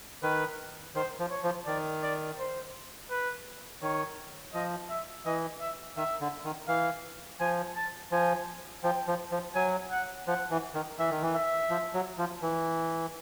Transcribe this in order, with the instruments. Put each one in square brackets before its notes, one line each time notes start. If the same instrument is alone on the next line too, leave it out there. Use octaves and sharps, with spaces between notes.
[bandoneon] D#3 [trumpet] B4
[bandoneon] D#3 [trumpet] C5
[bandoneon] F3
[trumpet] C#5
[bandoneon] F3
[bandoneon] D#3 [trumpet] D5
[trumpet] D5
C5
B4
[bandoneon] D#3 [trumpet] C#5
[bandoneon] F3 [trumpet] D#5
[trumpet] E5
[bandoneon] E3 [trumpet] D#5
[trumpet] E5
[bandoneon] D#3 [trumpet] E5
[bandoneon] D3
D#3
[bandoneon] E3 [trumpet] F5
[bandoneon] F3 [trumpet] G#5
[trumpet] A5
[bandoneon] F3 [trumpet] G#5
[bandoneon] F3 [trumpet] G5
[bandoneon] F3
F3
[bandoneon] F#3 [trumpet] G#5
[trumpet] F#5
[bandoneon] F3 [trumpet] F#5
[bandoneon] E3
D#3
[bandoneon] E3 [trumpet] E5
[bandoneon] D#3
E3
[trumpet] E5
[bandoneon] F3
F#3
F3
E3